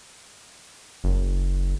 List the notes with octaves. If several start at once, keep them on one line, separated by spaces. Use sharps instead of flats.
F#1